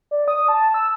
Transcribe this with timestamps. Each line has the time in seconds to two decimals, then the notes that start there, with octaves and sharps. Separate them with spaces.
0.11 D5
0.28 D#6
0.48 A5
0.74 E6